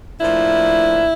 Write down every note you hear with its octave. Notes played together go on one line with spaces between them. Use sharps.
A2 F3 A#3 D4 E4